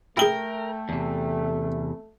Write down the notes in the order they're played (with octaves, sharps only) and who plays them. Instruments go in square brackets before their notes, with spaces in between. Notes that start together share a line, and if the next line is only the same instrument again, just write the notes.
[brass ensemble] A3 [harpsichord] E4 G#4 [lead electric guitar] A#4 [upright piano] G5 G7
[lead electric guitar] E2 C3